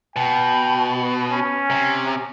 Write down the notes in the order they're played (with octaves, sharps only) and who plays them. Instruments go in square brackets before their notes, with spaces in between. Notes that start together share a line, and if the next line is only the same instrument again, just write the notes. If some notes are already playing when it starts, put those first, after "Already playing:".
[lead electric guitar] B2 [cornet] G5
[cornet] C#4
[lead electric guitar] C3